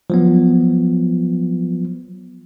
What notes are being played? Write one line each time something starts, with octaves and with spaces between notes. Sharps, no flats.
F3 F#3 B3